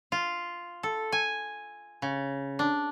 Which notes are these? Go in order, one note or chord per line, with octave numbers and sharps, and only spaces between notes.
F4
A4
G#5
C#3
D4